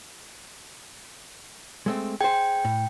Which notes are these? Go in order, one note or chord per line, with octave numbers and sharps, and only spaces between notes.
G#3 A3 C4
G#4 C5 G5
A2